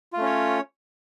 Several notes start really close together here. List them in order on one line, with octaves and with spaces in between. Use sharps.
F4 A3 C#4 C#5